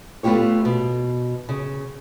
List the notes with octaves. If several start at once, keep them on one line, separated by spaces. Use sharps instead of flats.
A3 B3 D#4 F4 G4 C#5
B2
C#3